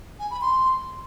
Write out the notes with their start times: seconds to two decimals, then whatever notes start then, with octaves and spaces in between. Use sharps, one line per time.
0.20 G#5
0.31 B5
0.41 C6